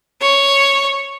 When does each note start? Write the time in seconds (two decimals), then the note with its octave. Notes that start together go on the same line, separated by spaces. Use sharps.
0.21 C#5